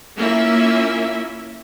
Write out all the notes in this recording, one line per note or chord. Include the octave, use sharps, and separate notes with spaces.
A#3 C#4 E4 F4 E5